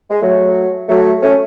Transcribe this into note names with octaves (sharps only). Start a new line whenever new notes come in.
G#3
F#3 A3
F#3 A3
A3 C#4